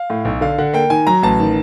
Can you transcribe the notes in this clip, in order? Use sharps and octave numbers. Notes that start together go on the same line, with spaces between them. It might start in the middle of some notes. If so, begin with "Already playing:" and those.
Already playing: F5
A2
B1
D3 F5
D3 F#5
A#3 G5
D#3 G#5
F#3 A#5
A1 A5
D#3